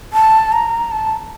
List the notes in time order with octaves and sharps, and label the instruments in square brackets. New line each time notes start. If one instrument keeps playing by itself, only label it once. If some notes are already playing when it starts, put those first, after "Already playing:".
[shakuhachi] A5
A#5
A5